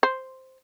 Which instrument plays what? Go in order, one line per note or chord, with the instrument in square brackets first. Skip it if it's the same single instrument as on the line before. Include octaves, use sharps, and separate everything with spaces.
[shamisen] C5